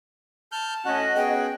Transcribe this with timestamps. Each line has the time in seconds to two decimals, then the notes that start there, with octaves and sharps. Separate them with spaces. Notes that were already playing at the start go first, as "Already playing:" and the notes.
0.52 A5 F6 G6
0.85 A2 C#4 F#4 D#5 F#5
1.16 B3 C#4 G#4 G5